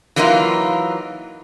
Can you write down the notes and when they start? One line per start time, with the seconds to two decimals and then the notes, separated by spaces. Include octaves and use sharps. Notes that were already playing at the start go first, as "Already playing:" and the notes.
0.16 E3 F#3 A#3 D#4 F4